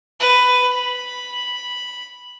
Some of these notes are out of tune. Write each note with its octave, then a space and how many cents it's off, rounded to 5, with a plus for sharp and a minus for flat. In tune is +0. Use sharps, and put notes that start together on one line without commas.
B4 +10
B5 -5